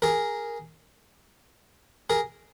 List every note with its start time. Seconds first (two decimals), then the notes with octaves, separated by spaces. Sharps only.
0.02 G#4 A#4
2.10 G#4 A#4